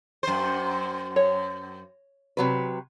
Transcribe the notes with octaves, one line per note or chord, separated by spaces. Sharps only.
F#2 C5
C#5
C3 F#3 B4